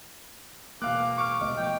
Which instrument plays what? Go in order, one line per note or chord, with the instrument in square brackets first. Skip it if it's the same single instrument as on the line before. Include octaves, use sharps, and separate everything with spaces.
[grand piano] E1 F5 F#6 [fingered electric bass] A#3 [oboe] D6
[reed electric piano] C#6 F6 [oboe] D6
[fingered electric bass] C2 A3 B3 [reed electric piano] D#5 [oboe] D6
[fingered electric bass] F3 [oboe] G5